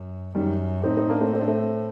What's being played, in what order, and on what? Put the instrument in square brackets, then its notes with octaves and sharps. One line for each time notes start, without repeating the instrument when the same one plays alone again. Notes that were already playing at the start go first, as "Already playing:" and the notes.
Already playing: [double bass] F#2
[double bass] F#2 [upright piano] D#3 G3
[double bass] A2 [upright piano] C4 D#4
[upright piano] C4 D#4
A#3 D4
A3 C4
C4
D4
A3 C4